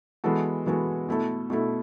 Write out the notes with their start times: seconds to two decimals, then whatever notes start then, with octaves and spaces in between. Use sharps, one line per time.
0.24 E3 G#3 B3 F#4 A4
0.66 E3 G#3 B3 F#4 A4
1.09 B2 A3 E4 A4
1.50 B2 A3 E4 A4